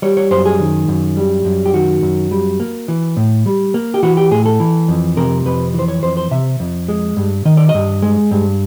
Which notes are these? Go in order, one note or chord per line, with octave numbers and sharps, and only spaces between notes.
G3 C#5
C#5
F#2 C5
G#4
D#3
F#2
G3
F#2
G4
D#3 F#4
F#2
G3
A#3
E3
A2
G3
A#3
G4
E3 F#4
G4
A2 G#4
A4
E3
F2
C3 A#4
F2 B4
E3 C5
C#5
F2 C5
C5
C3 E5
F2
G#3
G2
D#3 D#5
D5
D#5
G2
G#3
G2